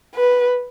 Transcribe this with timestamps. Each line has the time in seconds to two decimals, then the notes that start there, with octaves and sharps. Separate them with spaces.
0.15 B4